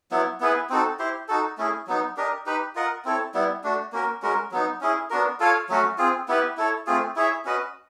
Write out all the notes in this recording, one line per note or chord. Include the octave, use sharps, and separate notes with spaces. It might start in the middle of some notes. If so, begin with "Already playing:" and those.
F#3 B3 E4
B3 E4 G#4 B4
C4 D#4 F#4 A4
E4 G4 C5
D#4 F#4 A4
A3 C#4 E4 G#4
F#3 B3 D#4
D4 G4 A#4 D#5
D#4 G4 B4
F4 A#4 D#5 F#5
C4 E4 A4 C#5
G3 B3 E4
A3 D4 F#4
A#3 C#4 F#4 A#4
G#3 C#4 F#4 A#4
F#3 B3 D#4
C#4 E4 G#4
B3 D4 F#4 A#4
F4 A4 C#5 F5
F#3 A3 C#4 F#4
C4 F4 G#4
B3 E4 G4 B4
E4 A4 C#5
A3 C4 F4 G#4
E4 G#4 C#5 E5
C#4 F#4 B4 D#5